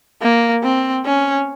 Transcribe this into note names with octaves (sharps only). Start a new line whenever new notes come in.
A#3
C4
C#4